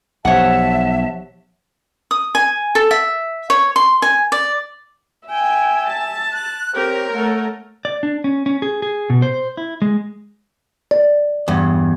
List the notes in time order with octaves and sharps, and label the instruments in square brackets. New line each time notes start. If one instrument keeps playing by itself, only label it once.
[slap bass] B1 [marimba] F3 G4 C5 [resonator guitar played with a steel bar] C#5 F#5 [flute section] E5 A5
[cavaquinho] D#6
G#5
A4
E5
C#5
C6
G#5
D5
[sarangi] E5 [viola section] G5 [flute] G#5
[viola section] A5
[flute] F#6
[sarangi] C4 [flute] G4 [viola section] A#4 C#5
[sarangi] A3 [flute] F#5
[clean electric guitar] D5
D4
C#4
C#4
G#4
G#4
B2
C5
E4
G#3
[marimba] D5
[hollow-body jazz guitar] E2 G2